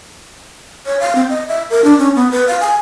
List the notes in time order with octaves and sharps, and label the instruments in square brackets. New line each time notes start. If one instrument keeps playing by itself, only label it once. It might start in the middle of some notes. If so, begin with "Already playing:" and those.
[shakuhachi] C#5
F5
C4
D#5
E5
A#4
D4
C#4
B3
B4
F5
G#5